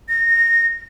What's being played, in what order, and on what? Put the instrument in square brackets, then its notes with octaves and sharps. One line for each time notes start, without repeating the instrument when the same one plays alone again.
[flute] A#6